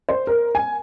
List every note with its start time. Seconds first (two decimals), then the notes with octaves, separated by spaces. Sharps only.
0.09 C5
0.27 A#4
0.55 G#5